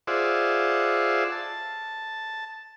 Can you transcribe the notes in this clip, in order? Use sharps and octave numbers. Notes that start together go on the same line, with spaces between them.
F4 G#4 C5 D5 E5 F#5
A5